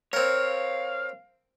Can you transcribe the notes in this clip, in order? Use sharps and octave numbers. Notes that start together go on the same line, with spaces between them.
C4 A#4 C#5 F5